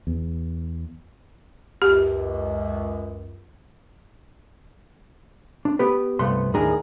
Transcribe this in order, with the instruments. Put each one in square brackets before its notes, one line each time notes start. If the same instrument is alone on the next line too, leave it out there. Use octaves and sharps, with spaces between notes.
[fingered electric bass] E2
[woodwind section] C#2 F#2 [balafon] G4
[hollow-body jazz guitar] D4
B3 G4 B4
C2 G2 A3 B3 C6
D#2 A2 D#3 D4 G#4 A#4